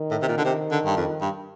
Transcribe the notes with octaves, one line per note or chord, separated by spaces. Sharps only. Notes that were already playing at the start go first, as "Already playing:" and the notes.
Already playing: D#3
A2
C3
A#2
D3
C3
D3
G2
F2
G2